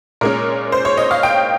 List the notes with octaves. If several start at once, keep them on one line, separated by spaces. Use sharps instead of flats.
A#2 G#3 C#4 A#4
C5
C#5
D#5
F5
G5